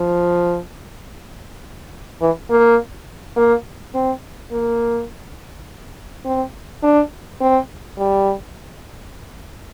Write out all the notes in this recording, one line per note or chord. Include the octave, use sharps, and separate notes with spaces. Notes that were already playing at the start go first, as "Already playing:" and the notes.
Already playing: F3
E3
A#3
A#3
C4
A#3
C4
D4
C4
G3